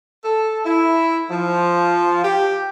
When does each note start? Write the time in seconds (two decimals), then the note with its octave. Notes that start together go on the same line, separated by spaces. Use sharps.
0.25 A4
0.66 E4
1.31 F3
2.24 G4